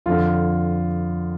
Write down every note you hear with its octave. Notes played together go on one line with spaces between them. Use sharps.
F2 D3 F4